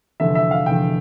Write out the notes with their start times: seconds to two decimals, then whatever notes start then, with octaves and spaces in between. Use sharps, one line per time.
0.20 F1 E2 D3 E5
0.35 E5
0.51 F5
0.66 F1 E2 D3 G5